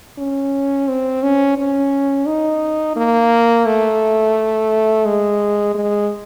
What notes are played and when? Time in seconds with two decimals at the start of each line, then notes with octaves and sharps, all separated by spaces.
0.18 C#4
0.88 C4
1.23 C#4
1.58 C#4
2.27 D#4
2.96 A#3
3.66 A3
5.06 G#3
5.74 G#3